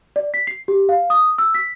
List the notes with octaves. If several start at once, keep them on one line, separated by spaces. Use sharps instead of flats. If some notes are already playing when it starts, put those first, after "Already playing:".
D5
B6
C7
G4
F5
D#6
E6
B6